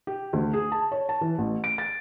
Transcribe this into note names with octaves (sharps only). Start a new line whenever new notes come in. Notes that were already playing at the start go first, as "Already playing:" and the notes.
G4
D2
G#4
A5
C#5
A5
E3
A1
D7
A6